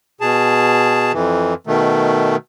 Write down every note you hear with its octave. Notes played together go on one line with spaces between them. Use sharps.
B2 G#4 A5
F2 E3
B2 D#3 A3